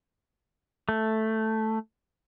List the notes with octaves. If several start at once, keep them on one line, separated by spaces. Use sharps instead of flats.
A3